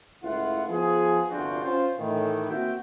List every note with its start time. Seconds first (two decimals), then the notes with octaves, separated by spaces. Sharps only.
0.23 C#2 A2 E4 F4 F#5
0.69 F3 B3 G#4
1.30 G1 C2 D4 F4 F#4 G5
1.63 C#4 F4 C5
1.98 A2 D#3 E3
2.50 A#3 C4 F#4 E5 G5